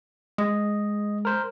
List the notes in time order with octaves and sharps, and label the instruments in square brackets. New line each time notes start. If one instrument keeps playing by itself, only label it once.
[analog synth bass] G#3 [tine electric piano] D#5
[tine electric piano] A#4 C5